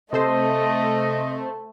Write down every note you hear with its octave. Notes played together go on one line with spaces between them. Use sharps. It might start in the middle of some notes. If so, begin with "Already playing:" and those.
C3 A3 A4 C5 D#5